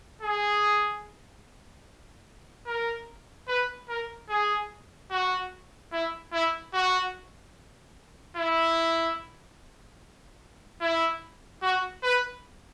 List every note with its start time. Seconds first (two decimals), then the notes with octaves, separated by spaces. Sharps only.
0.22 G#4
2.66 A#4
3.48 B4
3.89 A#4
4.29 G#4
5.11 F#4
5.92 E4
6.33 E4
6.74 F#4
8.37 E4
10.81 E4
11.63 F#4
12.03 B4